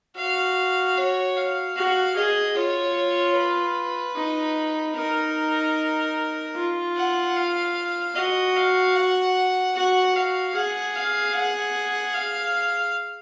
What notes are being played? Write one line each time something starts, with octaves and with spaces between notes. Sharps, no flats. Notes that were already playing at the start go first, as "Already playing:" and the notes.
F#4 F5
C#5
F5
F#4 F5
G#4 D#5
F4 C#5
B4
D#4
D#4 A#4
F4
F#5
F5
F#4 D#5
F5
F#5
F#4 F#5
F#4 F5
G#4 F#5
F5
F#5
F5